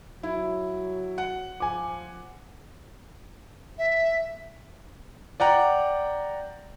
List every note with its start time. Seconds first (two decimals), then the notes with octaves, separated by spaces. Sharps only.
0.23 F#3 E4
1.18 F#5
1.60 F3 G#5 D6
3.78 E5
5.40 D5 F#5 G5 A#5